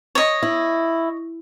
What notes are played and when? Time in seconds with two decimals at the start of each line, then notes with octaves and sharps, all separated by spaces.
0.15 C#5 D#5
0.43 E4